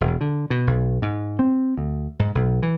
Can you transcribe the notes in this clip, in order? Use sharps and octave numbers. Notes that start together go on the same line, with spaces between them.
E1
D3
B2
B1
G#2
C4
D2
G#2
B1
E3